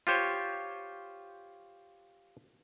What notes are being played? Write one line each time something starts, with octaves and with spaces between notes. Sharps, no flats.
F4 G4 C5 C#5